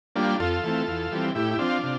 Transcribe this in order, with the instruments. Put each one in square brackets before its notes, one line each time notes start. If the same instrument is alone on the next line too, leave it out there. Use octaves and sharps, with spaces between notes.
[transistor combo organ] G3 A#3 D4 F4
F2 F4 A4
E3 A3 C4
E2
E3 G3 C4
A2 E4 G4
E4
F3 C4 D4 F4
C3